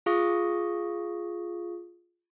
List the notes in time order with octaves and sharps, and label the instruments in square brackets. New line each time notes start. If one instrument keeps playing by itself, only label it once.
[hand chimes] F4 G#4 F5 C#6 D#6 A#6